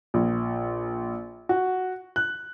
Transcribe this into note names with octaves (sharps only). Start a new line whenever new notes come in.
A#1
F#4
F#6